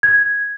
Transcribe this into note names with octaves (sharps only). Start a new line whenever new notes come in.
G#6